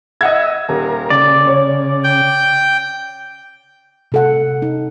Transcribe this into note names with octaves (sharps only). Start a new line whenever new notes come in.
D#5 E5 F#5 G#6
D#1 A#4
C#3 D5
C#5
G5
C3 A4 F#5
D#4